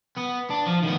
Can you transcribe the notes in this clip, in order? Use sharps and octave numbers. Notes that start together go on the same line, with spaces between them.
B3
D4
F3
D#3 B3